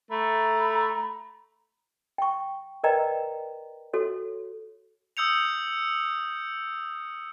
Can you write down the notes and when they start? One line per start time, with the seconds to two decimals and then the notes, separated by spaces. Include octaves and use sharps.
0.10 A3 A#5 B5
2.18 G5 C#6
2.84 A#4 B4 D5 D#5 G5 A#5
3.93 F#4 A4 C#5
5.17 D#6 E6 G6 C#7 F7